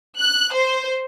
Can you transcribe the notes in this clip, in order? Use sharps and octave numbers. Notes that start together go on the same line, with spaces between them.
F#6
C5